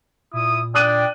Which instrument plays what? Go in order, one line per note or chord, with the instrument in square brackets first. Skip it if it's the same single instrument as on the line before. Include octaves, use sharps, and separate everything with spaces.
[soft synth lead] A#2 [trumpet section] E4 D#6
[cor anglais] D4 [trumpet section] G5 [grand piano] D#6 F#6 D#7